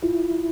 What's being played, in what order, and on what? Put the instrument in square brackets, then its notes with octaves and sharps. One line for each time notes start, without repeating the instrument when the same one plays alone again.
[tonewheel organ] E4 [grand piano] F4